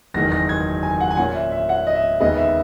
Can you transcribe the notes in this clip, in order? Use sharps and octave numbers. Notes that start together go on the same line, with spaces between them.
F#1 E2 D#3 G#3 A#6
A#6
G#6
G#5
F#5
G#5
A#2 A#3 C#4 F#5
E5
E5
F#5
D#5
E5
D#2 C#3 G#3 B3 D#5
E5